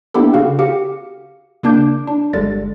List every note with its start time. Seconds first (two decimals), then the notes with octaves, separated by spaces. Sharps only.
0.14 A#3 B3 D4 E4 G4 A4
0.33 C#3 F#4 F5 F#5
0.59 F#4 G4 F5 C#7
1.63 C#3 A#3 D4 D6 G6 D7
2.07 D4
2.33 G1 D3 G3 G#3 A6